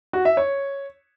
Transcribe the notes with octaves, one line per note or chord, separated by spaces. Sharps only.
F#4
E5
C#5